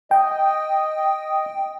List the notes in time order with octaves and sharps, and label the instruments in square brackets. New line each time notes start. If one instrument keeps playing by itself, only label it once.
[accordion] D#5 [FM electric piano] G5